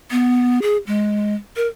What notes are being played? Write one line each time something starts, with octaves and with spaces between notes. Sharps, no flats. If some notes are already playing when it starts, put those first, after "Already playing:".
B3
G#4
G#3
A#4